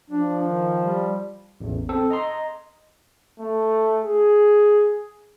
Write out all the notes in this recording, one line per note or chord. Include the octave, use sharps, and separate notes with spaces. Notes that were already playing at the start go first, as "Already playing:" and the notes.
F3 D4
D#3
G3
A1 E2
C4 A4
D#5 A#5 C6
A3
G#4